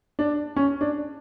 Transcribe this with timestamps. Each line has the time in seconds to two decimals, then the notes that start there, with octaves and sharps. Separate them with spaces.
0.19 D4
0.56 C#4
0.81 D4